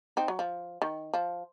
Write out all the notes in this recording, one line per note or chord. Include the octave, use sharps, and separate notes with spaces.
C4 D#4
F#3
F3
D#3
F3